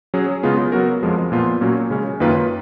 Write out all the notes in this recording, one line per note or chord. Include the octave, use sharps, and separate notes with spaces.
F#3 C#4 G#4
C#3 G#3 B3 F4
F#3 B3 F#4 A#4
F2 F3 G#3
A#2 F3 B3 F4
A#2 F#3 A#3 C#4 F#4
C#3 G#3 C#4
F#2 D#3 A#3 F4 B4